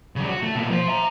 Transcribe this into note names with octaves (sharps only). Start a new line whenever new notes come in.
C#3 G3
F#4
A3
B2 A#3
F3 C5
E5 A#5